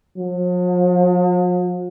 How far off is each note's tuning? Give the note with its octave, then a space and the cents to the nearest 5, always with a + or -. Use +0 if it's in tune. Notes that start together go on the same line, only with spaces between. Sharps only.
F3 +45